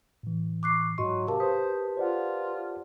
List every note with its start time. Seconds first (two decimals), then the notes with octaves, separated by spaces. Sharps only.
0.23 A2 E3
0.63 C#6 D6 F#6 C7
0.98 G#2 F#3 F#4 D#5 C6 C#6
1.27 C3 G4 A#4 F5 A5
1.40 B4 C5 D#6
1.97 F4 C5 D5 F#5